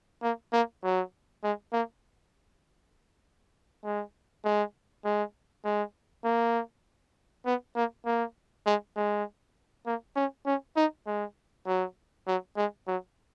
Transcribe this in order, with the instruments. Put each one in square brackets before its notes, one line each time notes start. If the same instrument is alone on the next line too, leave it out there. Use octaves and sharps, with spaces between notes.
[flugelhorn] A#3
A#3
F#3
G#3
A#3
G#3
G#3
G#3
G#3
A#3
B3
A#3
A#3
G#3
G#3
A#3
C#4
C#4
D#4
G#3
F#3
F#3
G#3
F#3